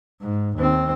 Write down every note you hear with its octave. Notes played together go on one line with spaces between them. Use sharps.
G#2
D#2 C4